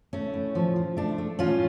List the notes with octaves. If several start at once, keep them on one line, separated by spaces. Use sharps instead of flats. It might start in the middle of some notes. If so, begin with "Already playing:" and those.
A3 C#4
A2
F3
F3
A3 D4
A3
A2 C#4 F4